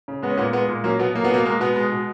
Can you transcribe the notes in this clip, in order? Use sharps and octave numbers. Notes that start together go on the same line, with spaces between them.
C#3
G#3 B3
C#4
A#2 B3
G#3 B3
A#2
F#3 A#3 C#4
B2 B3
F#3 A#3
B3
B2 A#3
G#3 A#3
B2 B3
G#3
B2